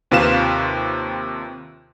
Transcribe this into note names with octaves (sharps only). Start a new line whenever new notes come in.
D#2 C3 F4 B4 F5 E7